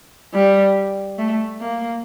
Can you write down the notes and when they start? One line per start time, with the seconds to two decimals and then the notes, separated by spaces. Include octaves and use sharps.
0.34 G3
1.18 A3
1.61 A#3